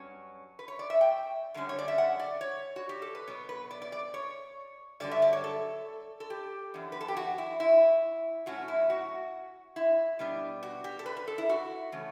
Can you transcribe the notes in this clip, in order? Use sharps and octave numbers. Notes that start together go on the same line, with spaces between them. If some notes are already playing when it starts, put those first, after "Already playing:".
Already playing: G2 F#3 C#4 C#5
B4
C#5
D5
E5
G5
F#2 D3 G3 C#4
C#5
D5
E5
F#5
D5
C#5
F#4
G4
A4
B4
B2 F#3 B3 C#5
B4
D5
D5
D5
C#5
G2 D3 F#3 D5
E5
D5
C#5
A4
A4
G4
F#2 E3 B3 D4
B4
A4
G4
F#4
E4
E4
A2 F#3 C#4 F#4
E4
F#4
E4
B2 G3 B3 D4
F#4
G4
A4
B4
B4
A4
E4
F#4
C#3 E3 A3 C#4